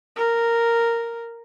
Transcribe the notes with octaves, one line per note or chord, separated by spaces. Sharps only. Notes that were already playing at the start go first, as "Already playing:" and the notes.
A#4